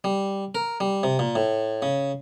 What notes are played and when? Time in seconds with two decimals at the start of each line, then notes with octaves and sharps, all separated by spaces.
0.04 G3
0.55 A#4
0.80 G3
1.03 C3
1.19 A#2
1.35 A2
1.82 C#3